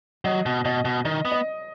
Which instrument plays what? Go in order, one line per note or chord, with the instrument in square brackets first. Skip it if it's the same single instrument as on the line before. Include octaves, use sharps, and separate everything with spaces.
[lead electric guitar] F#3 [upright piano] D#5
[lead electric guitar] B2
[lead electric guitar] B2 [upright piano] D#5
[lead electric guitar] B2
[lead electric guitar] D#3 [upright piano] D#5
[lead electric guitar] B3
[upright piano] D#5